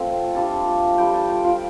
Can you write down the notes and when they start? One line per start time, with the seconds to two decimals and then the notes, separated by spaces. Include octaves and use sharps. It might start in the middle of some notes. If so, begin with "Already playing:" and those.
Already playing: A3 C4 F4 A4
0.35 G3 D4 F4 A5
0.98 G3 F4 G5
1.14 A5
1.29 G5
1.44 F4